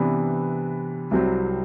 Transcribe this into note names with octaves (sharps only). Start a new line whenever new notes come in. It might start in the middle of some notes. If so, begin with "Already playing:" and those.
Already playing: C3 E3 B3 D4
C2 C3 F#3 C4